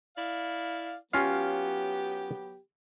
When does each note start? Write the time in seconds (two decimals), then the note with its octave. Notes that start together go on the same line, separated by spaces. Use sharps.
0.17 E4 D5 F5
1.13 F#3 B3 C#4 F4 G4 F5